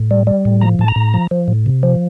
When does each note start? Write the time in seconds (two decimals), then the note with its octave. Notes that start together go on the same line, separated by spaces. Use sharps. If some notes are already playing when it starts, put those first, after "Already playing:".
Already playing: A2
0.11 G3
0.27 G3
0.45 A2
0.61 F3 A#5
0.79 A2 A5
0.88 A#5
0.96 A2
1.14 F3
1.31 F3
1.48 A2
1.66 C3
1.83 F3